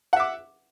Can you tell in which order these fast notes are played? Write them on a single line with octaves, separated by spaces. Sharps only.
F#5 E5 D6